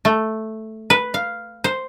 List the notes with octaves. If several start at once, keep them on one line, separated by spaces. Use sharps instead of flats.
A3
B4
F5
C5